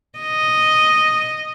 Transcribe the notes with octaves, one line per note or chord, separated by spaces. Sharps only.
D#5